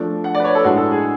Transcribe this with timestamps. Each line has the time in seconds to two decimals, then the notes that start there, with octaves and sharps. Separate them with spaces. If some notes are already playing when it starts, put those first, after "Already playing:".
Already playing: F3 A3 D4
0.24 F#5
0.35 D5
0.40 B4
0.44 C#5
0.55 A4
0.64 A2 G#3 D4 F#4
0.77 A4
0.91 G#4